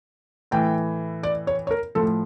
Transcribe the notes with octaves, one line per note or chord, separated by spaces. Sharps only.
A2 E3 G5
D5
C#5
C#5
A#4
A2 F3 A4